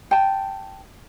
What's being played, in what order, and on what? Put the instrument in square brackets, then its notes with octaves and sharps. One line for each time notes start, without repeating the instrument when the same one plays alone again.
[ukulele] G5 A5